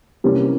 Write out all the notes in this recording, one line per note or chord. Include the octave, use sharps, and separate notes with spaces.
C3 E3 G3 A#3 C#4